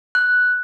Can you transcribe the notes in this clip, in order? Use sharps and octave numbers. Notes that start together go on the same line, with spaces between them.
F#6